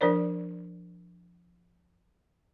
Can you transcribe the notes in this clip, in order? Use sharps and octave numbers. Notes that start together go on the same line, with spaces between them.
F3 D4 A#4 C5 D5